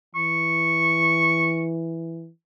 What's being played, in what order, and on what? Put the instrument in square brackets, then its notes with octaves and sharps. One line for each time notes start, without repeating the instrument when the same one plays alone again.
[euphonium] E3 [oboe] C#6